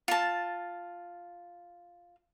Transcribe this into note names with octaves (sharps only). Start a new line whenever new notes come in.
F4 A5